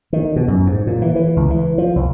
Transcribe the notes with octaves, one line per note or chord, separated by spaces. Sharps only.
D#3
B2
F#2
G#2
A#2
E3
E3
C#2
E3
F3
C2